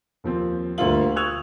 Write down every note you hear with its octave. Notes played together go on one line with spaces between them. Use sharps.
D#2 F3 C4
D2 G2 A#3 F4 F5 F#7
C#6 D#6 E6 F#6 G#6 F7